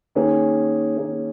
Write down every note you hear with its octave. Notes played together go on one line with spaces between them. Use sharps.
D#3 A#3 C#4 G#4
D#3 A#3 C#4 G#4